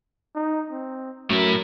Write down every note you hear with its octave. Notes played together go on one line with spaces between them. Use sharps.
D#4
C4
F#2 A2 A3 E4 A#4